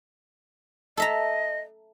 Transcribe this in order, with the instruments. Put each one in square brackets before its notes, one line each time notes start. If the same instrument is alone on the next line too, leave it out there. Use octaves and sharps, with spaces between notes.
[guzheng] A4 E5 A#5 [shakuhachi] D#5